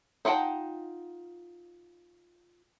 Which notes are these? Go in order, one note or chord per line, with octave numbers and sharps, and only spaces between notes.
D#4 F4 F#5 G5 A5